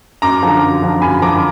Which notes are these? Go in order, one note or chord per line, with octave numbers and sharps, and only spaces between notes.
F#2 A#5 D6
D3 F3
F#2
D3 F3
F#2 G#5 B5
D3 F3 A#5 D6